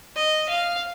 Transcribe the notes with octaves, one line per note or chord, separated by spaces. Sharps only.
D#5
F5